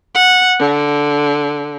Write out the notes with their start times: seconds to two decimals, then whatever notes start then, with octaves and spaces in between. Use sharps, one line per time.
0.15 F#5
0.59 D3